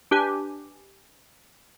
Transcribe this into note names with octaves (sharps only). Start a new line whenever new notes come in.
D4 G4 B4 G#5